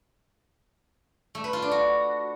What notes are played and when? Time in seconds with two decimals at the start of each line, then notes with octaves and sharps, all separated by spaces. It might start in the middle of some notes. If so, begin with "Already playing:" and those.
1.35 A3
1.44 B4
1.53 F4
1.62 D4
1.71 F#4